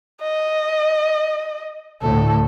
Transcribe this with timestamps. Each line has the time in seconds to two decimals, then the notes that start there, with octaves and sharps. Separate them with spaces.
0.22 D#5
2.02 D2 A2 A4